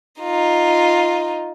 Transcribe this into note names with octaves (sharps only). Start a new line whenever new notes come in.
D#4 F4